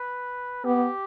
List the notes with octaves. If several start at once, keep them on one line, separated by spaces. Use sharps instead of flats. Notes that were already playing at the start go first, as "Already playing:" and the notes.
Already playing: B4
B3 G4